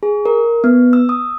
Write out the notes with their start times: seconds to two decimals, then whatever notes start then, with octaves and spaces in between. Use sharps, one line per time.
0.03 G#4
0.26 A#4
0.64 B3
0.93 E6
1.09 D#6